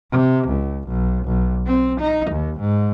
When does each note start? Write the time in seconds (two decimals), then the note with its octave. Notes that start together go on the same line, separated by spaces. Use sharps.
0.11 C3
0.48 C#2
0.88 B1
1.26 B1
1.67 C4
2.00 D#4
2.31 D#2
2.60 G#2